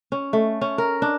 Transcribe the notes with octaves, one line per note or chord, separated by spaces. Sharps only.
C#4
A3
C#4
A#4
D4